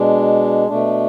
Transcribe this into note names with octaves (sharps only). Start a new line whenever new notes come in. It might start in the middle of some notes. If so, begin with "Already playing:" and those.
Already playing: B2 G#3 D4
B2 A3 D4